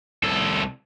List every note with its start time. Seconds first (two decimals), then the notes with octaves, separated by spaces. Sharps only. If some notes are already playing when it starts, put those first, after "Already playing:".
0.24 C2 A4